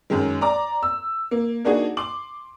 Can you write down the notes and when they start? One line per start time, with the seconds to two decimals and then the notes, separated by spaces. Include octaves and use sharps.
0.10 F#2 D#3 G#3
0.41 D5 A#5 D6
0.83 E6
1.31 A#3
1.65 A#3 D4 D#4 F#4 G#4
1.97 C6 D6 F#7